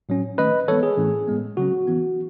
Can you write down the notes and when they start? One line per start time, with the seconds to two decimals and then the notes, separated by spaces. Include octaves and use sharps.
0.09 A2 F#3 C#4
0.38 D#3 A3 C#4 B4 D#5
0.68 E3 G#3 B3 A4 C#5
0.83 G#4
0.97 A2 E3 A3 C#4
1.28 A2 G#3 B3
1.57 C#3 F#3 C#4 F#4
1.87 E3 B3